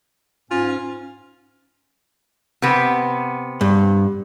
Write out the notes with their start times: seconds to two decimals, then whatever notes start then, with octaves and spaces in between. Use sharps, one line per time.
0.51 G#2 C#4 F4
2.62 C3 B3
3.61 G2